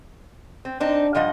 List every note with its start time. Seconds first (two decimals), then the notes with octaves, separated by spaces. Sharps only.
0.65 C4
0.80 C4 D4 D#4
1.15 G2 F3 D#5 F#5